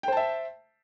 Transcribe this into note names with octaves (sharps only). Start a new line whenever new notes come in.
C5 E5 G5 A5